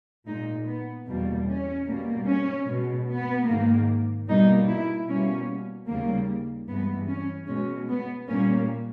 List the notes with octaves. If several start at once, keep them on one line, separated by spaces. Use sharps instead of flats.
A#2 G#3 D#4
B3
E2 B2 G3 A#3
C#4
B2 G3 A#3
C#4
B2 G#3
B3
G#2 D#3 A#3
B2 G3 A#3 D#4
E4
B2 G3 A#3 C#4
D#2 C#3 G3 A#3
G2 E3 G#3 B3
C#4
B2 G#3 C#4
B3
A#2 G3 A#3 C#4